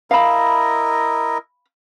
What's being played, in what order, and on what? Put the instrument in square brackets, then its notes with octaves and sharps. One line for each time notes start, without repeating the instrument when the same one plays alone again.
[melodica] E4 A#4 D#5 [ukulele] F5 B5